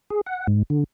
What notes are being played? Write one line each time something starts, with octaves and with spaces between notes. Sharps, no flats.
G#4
F#5
G#2
D3